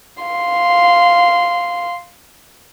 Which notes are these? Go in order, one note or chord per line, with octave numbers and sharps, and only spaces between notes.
F5 C6